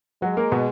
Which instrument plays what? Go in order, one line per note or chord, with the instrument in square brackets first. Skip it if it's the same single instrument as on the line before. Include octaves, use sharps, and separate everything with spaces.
[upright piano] F#3 F#4 [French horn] G#3
[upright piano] A#3 A#4
B2 B3